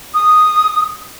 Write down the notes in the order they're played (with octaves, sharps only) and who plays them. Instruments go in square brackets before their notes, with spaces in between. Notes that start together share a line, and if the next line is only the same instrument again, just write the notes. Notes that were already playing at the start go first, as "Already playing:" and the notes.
[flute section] D#6